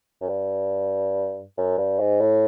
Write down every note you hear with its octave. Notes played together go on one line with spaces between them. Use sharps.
F#2
G2
F#2
G2
G#2
A2